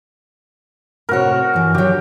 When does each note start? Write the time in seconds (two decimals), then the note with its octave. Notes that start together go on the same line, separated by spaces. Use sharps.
1.09 A2 C3 F#4 A#4 C#5
1.54 G2 E3
1.75 D3 F#3 G4